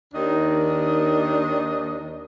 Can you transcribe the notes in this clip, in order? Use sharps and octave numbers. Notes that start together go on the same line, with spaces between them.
D#2 D#3 D4 D#5